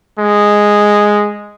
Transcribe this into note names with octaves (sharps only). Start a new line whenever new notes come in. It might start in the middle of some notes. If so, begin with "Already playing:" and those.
G#3